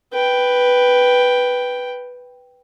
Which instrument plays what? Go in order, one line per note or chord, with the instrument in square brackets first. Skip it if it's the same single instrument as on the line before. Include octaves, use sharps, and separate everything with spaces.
[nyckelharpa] B4 G5